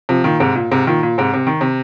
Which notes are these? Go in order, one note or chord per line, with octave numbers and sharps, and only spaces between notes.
C3 F3
A#2 D#3
G#2 C3
A#2
G#2 C3
A#2 D#3
A#2
G#2 C3
C3
D#3
C3